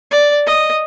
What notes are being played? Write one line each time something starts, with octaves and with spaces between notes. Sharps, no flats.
D5
D#5